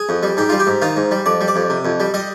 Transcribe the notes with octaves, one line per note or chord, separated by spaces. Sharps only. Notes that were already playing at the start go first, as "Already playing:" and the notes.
Already playing: G#4
F2
G3
G#2 G4
G3 F4
G4
G#2
D#3 F4
G#2
G3
F2 D5
G3
D5
F2
C3
F2
G3
G3 D#5